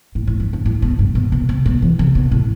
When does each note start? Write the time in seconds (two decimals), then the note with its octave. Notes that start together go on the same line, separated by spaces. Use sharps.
0.15 A2
0.27 A2
0.40 G2
0.53 G2
0.66 A2
0.82 B2
0.99 G2
1.15 B2
1.32 B2
1.49 C3
1.66 B2
1.82 E3
1.99 C3
2.15 B2
2.31 A2